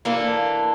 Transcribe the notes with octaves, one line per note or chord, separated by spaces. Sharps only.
E3 A#3 D4 A4